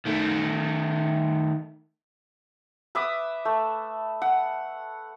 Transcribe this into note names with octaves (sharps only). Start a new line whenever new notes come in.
D#3 A3
B4 E5 D6 D#6
A3
F#5